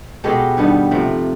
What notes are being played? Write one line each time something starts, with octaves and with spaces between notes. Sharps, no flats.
B2 G#3 B3 G4 A4
G2 D#3 G3 B3
C3 F3 A3